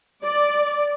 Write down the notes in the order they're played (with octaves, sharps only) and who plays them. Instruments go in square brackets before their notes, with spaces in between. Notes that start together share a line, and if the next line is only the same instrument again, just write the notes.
[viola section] D5